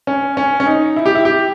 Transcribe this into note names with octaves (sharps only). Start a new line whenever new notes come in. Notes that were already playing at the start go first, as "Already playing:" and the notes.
C#4
C#4
C#4
D#4
E4
G4
E4
G4